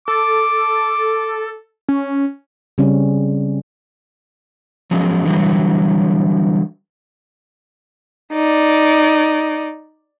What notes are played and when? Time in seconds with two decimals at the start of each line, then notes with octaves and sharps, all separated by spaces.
0.08 A4 D6
1.89 C#4
2.78 C#3 G3 C4 C#4
4.91 F3 F#3 G#3 C#4
5.25 D3 E3 F#3 G3
8.33 D#4 D5